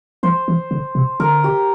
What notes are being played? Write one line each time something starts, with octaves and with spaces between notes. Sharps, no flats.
F3 C5
E3
D3
C3
D3 A#4
G4